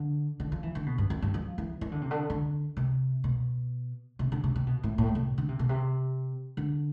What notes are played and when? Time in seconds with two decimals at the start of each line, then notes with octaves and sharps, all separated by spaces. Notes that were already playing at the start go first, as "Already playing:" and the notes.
Already playing: D3
0.40 D3
0.52 F3
0.63 E3
0.75 D3
0.86 B2
0.98 G2
1.10 F2
1.22 G2
1.34 F3
1.58 E3
1.81 E3
1.92 D3
2.01 C3
2.11 D3
2.30 D3
2.77 C3
3.24 B2
4.19 C3
4.32 D3
4.44 C3
4.56 C3
4.67 B2
4.83 A2
4.98 A2
5.15 C3
5.38 D3
5.48 C3
5.59 B2
5.69 C3
6.57 D3